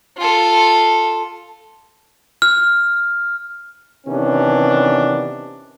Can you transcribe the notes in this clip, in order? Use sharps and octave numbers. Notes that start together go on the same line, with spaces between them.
F4 A4
F6
C3 D#3 E3 B3 C#4 D4